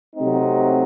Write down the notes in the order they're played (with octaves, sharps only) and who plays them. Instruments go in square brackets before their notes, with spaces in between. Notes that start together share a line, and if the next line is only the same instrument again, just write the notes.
[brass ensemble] C3 F#3 A3 C4 D#4